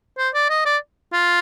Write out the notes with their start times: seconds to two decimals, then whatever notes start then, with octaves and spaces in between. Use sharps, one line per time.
0.18 C5
0.34 D5
0.50 D#5
0.65 D5
1.13 F4